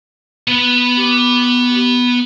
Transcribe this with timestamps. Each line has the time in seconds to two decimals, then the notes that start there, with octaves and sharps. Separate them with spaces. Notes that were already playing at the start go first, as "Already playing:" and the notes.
0.48 B3 F#5
0.97 G4